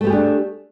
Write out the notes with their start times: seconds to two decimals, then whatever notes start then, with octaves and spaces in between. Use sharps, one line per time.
0.01 A3
0.04 B3
0.07 G4
0.10 G#4
0.13 D4